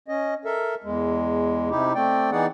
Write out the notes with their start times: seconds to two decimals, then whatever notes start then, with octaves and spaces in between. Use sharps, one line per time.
0.08 C#4 D#5
0.45 A4 A#4 E5
0.84 E2 G#3
1.70 C3 D#4 E4 G4
1.95 A3 C4 D5 G5
2.32 E3 B3 D#4 G#4 D5 F#5